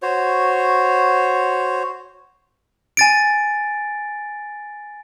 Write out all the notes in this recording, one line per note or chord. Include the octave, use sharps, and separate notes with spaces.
F#4 C5 C#5
G#5 A6 D7